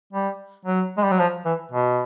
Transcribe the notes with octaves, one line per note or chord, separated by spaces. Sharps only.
G3
F#3
G#3
G3
F#3
F3
E3
B2